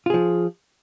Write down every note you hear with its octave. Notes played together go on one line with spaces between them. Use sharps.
F3 F4 G#4